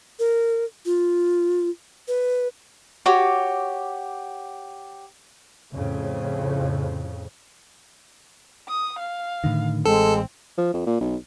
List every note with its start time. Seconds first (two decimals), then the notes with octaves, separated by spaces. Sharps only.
0.19 A#4
0.85 F4
2.08 B4
3.06 F#4 G4 C#5 D6
5.74 F2 A2 C#3
8.68 D#6
8.99 F5
9.44 A2 D3 D#3
9.85 A1 G#3 C4 A4
10.58 F3
10.74 F2
10.87 A#2
11.01 B1